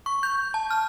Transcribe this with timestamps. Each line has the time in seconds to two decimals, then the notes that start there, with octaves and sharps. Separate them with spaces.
0.06 C#6
0.23 G6
0.54 A5
0.70 F6